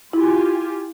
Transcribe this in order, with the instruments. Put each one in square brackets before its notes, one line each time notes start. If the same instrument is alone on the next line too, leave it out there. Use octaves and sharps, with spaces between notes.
[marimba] E4 [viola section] F4 G4 G#5